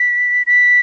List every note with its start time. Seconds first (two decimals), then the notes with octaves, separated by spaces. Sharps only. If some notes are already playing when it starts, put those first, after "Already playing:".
Already playing: B6
0.47 B6